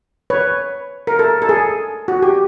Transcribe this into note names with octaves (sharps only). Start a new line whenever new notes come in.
B4 C#5
A#4
A4
A4
G#4
F#4
G4